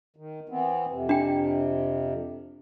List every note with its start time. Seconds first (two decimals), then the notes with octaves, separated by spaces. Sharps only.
0.16 D#3
0.49 E3 B3 C4
0.89 F2 C3
1.09 D4 G5